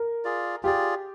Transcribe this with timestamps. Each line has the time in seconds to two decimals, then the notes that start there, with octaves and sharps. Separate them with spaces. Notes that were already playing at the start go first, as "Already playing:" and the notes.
Already playing: A#4
0.25 F4 G#4 D5
0.64 F4 G4 G#4 D5